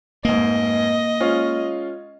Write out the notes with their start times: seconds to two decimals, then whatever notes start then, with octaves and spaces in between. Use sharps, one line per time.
0.25 F1 G#2 A#3 D#5
1.20 G#3 C#4 F4